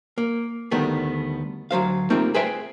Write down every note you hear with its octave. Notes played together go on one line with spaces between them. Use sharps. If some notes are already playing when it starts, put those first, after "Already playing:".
A#3
D2 D#3 G3 A3 B3
D2 F#3 C5 F5
G3 A3 A#3 C4 D#4 F4
G#4 B4 C5 E5 G5